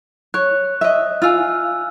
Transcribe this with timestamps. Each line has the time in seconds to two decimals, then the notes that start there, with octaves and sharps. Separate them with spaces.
0.34 C#5 F#6
0.81 D#5 E5
1.22 F4 F5 G#5 E6 F6